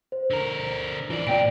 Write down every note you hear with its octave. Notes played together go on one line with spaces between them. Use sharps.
C5
D3 A#4
E3 F4 D5
A#2 C4 D5 G5 D7